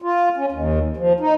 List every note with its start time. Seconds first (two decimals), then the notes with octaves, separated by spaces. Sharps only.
0.02 F4
0.37 C#4
0.52 D#2
0.97 F3
1.20 D#4